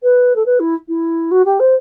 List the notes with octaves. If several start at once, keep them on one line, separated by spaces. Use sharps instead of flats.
B4
A4
B4
E4
E4
F#4
G4
C5